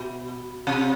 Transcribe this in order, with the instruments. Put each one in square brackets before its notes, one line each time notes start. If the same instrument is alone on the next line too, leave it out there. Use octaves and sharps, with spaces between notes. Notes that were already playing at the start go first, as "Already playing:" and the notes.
Already playing: [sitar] B2 [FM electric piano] F#4
[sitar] C3